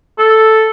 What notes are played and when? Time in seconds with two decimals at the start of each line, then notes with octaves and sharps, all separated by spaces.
0.18 A4